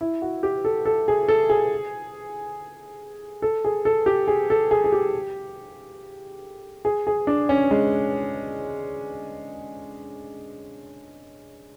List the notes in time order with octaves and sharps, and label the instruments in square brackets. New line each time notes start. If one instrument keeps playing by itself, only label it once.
[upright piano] E4
F#4
G4
A4
A4
G#4
A4
G#4
A4
G#4
A4
G4
G#4
A4
G#4
G#4
G4
G#4
G#4
D4
C#4
G#3